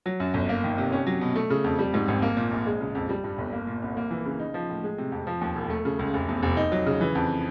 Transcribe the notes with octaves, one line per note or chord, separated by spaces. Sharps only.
F#3
F#2
G1
A#3
D#3
C3
C#4
F#3
B2
A3
C#3
F2
G3
G#2
G#1
A#3
A#2
A#1
G#3
C#3
F2
G3
G2
G1
A#3
A#2
C2
A#3
E3
C#3
D#4
F3
A2
G#3
C3
F2
F3
D#2
E1
A3
C#3
C#2
F1
E2
F1
D#4
F#3
C#3
E3
F2